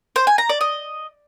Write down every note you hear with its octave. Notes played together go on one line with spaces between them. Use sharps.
C5
G#5
A#5
D5
D#5